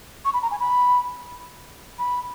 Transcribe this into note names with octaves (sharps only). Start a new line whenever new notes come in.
C#6
B5
A#5
G#5
B5
B5